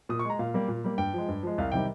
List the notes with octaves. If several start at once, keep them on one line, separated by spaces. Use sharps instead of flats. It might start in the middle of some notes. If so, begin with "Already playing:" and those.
A#2 D#6
C#6
G#3 A#5
A#2 F5
G3 A#3
A#2
G3 A#3
G2 G5
F3 G#3
G2
F3 G#3
C2 F5
C3 D#3 G3 G5